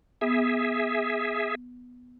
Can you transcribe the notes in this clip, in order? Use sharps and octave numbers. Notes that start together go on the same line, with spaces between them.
B3 G#4 E5